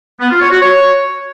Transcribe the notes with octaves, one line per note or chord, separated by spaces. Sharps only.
B3
F4
C#5
F#4
C#5